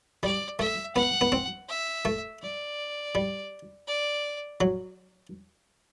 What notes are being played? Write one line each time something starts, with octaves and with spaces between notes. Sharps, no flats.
G3 D5
A3 E5
B3 F#5
B3
C4
E5
A3
D5
G3
D5
F#3